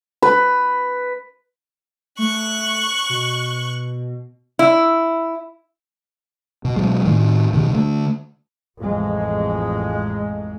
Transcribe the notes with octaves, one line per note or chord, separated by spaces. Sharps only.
B4
A3 C#6 F#6
B2
E4
B2
B2 F#3 G#3
A2 D#3
B2 D#3
D3 A3
A1 F2 G#3